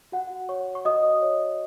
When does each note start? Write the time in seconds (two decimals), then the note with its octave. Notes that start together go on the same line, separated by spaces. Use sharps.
0.12 F#4 F#5
0.49 C#5 C#6
0.75 C#6
0.85 F#4 D#5 D#6
1.22 C#5